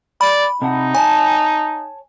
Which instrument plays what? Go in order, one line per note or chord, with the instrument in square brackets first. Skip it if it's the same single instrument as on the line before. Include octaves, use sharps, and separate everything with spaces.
[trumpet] D5 [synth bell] B5
[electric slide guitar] C3 D4 F#5 [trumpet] D#4
[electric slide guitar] C#5 A5 [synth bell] G#5